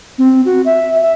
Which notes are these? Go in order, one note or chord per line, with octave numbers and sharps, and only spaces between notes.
C4
F#4
E5
E5